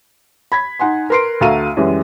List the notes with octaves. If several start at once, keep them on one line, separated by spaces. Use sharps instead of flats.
B5 G#6 B6
D#4 F#5 G#5 C6
A#4 B4 C6 C7 D7
D2 F#4 A4 F5 A#5 D#7
F#2 E3 G3 G#3